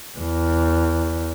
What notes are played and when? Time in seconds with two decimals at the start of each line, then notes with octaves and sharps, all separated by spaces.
0.19 E2